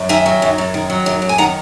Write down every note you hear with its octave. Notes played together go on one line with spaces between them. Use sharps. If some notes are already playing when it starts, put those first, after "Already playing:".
Already playing: F#2
D#3 E5 G#5
F#3
F#2
F#2
D#3
F#3
F#2
F#2
G#5
D#3 F#5 A#5